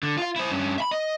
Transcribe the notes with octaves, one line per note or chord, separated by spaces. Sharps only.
D3
F4 F5
E4 C5
G2 C#4
E5 B5
D#5